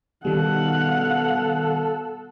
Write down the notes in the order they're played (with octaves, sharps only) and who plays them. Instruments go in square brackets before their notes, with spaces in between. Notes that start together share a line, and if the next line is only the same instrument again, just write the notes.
[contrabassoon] B2 [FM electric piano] D#3 G3 [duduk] A4 [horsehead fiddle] F5 F#5